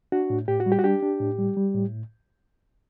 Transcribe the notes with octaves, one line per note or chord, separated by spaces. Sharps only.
D4 F#4
A2
A2 G4
F#4
G3
G4
F#4
D4 G4
D4
A2
G3
G3
A2